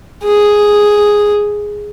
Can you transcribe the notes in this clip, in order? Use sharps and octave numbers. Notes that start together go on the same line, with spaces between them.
G#4